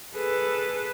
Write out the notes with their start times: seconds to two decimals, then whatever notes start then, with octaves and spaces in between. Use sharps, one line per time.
0.14 G#4 A4 B4